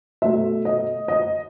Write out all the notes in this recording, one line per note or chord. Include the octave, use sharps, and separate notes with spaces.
B2 A3 E5
D#5
D#5